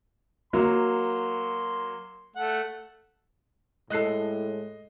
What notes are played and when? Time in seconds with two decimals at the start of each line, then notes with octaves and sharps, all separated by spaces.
0.53 F#3 A#3 C6
2.36 A3 F#5
3.90 A2 G#3 A4 D#5 F#6 C7